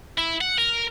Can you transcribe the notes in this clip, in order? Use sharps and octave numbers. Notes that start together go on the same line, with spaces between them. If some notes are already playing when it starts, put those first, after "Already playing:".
E4
F#5
A#4